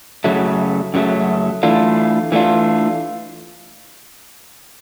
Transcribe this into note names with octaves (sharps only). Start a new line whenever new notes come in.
F#2 C#3 F#3 A3
F#2 C#3 F#3 A3
E3 A3 D4 F4
E3 A3 D4 F4